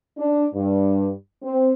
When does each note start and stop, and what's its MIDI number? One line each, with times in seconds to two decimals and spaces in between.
0.18 0.45 62
0.55 1.09 43
1.43 1.73 60